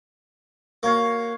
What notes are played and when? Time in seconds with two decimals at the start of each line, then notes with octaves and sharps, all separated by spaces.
0.83 A#3 F#4 C#5 F5